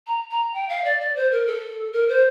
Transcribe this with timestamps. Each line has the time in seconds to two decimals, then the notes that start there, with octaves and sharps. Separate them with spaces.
0.07 A#5
0.31 A#5
0.53 G5
0.69 F5
0.84 D5
1.00 D5
1.15 C5
1.31 A#4
1.46 A4
1.93 A#4
2.08 C5